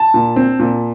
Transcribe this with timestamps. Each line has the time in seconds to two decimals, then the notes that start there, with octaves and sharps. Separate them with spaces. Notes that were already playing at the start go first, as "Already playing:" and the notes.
Already playing: A5
0.14 A#2
0.36 C4
0.59 A#2